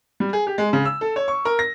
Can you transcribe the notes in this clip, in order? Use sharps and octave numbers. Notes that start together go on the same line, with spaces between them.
G3
G#4
G4
G#3
C#3
E6
A4
C#5
C#6
A#4
A#6